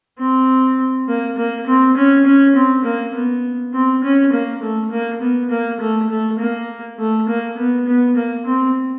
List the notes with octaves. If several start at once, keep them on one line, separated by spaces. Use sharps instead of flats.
C4
A#3
A#3
C4
C#4
C#4
C4
A#3
B3
C4
C#4
A#3
A3
A#3
B3
A#3
A3
A3
A#3
A3
A#3
B3
B3
A#3
C4